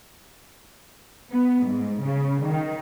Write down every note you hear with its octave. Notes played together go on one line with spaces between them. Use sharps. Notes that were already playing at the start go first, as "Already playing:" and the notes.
B3
G#2
C#3
D#3